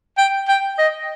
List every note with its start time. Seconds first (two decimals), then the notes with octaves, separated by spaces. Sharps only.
0.18 G5
0.48 G5
0.78 D#5